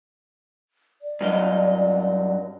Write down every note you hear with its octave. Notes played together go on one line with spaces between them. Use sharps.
D5
G2 F#3 D#5